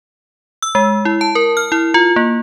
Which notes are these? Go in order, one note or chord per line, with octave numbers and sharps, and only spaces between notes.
E6
G#3
E4
A5
A#4
F6
E4
F4
A#3